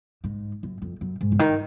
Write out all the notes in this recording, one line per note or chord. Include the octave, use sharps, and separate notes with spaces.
G#2
F#2
F2
F#2
G#2
C#3
D#3